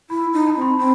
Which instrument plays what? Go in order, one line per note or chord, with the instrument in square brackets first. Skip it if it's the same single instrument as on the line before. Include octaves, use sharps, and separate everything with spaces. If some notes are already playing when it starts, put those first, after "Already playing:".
[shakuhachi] E4 [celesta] B5
[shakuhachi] D#4
[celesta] A5
[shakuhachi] C4 [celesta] B5
[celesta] C6
[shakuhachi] C4 [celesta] B5